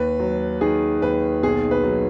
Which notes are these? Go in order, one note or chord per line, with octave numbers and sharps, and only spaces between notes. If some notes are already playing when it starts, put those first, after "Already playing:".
Already playing: D#2 B4
F#3
D#3 G#4
D#2 B4
B1 G#4
B4
F#3